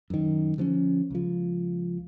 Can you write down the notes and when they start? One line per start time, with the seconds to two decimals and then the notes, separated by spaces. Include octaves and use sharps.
0.10 F#2 D#3
0.58 D3 F3 B3 C#4
1.10 C#2 F3